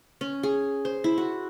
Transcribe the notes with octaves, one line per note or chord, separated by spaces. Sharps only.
C#4
G#4
C5
E4
F#4